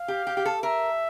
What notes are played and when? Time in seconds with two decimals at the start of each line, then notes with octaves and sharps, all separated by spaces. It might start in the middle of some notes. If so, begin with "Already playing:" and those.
Already playing: F5
0.08 G4
0.27 G4
0.37 G4
0.45 A4
0.63 A#4 E5